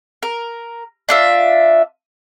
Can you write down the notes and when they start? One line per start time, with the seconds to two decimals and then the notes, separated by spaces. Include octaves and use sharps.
0.23 A#4
1.09 D4 F4 E5